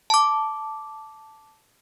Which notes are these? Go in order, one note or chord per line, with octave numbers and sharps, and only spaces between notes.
A5 D6